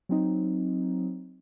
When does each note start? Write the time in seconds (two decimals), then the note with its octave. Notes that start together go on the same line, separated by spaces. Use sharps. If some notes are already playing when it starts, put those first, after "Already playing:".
0.09 F#3 C4 D#4